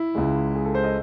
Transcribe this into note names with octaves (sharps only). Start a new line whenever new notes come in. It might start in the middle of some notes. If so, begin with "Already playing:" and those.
Already playing: E4
C#2 C#3 G#3
G#4
A4
C5
D#5